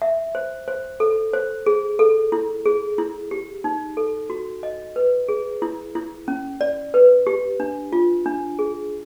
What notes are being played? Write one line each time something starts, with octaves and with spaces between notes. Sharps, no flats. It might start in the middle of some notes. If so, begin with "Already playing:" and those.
E5
C5
C5
A4
C5
G#4
A4
E4
G#4
E4
G4
D#4
A4
F#4
D#5
B4
G#4
E4
E4
C#4
D5
B4
G4
D4
F4
D4
G#4